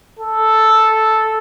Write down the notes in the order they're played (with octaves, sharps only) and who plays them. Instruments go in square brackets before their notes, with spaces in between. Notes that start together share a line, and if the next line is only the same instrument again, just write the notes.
[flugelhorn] A4